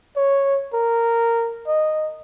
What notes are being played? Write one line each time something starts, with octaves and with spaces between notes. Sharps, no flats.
C#5
A#4
D#5